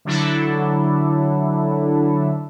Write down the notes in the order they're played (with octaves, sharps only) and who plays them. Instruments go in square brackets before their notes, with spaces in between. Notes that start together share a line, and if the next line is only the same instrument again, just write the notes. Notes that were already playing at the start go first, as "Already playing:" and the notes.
[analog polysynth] D3 F#3 D4 E4 A4